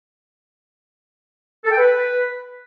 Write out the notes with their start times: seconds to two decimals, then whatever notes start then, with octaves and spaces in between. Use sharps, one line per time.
1.65 A4
1.71 G5
1.78 B4